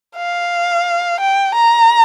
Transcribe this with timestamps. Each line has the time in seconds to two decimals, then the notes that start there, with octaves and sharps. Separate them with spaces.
0.16 F5
1.20 G5
1.55 A#5